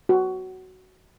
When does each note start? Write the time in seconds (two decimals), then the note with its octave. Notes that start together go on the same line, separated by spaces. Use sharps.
0.09 F#4